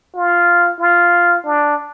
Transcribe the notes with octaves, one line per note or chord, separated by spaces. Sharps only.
F4
F4
D4